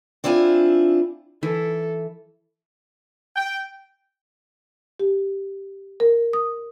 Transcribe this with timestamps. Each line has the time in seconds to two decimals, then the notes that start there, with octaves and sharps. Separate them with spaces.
0.24 C4 D4 E4 F4 G#5
1.43 E3 A4
3.36 G5
5.00 G4
6.00 A#4
6.33 D#6